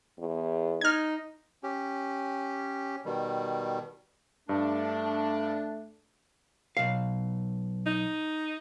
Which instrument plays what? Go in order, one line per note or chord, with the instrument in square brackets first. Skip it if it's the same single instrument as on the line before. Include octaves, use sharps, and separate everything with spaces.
[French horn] E2
[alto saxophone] D#4 [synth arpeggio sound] F6 G#6
[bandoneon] C#4 G4
B2 D#3 G3
[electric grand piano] G2 [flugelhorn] A3 [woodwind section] D4
[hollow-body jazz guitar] B1 F5
[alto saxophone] D#4